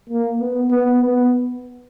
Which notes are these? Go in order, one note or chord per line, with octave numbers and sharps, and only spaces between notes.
A#3
B3
B3
B3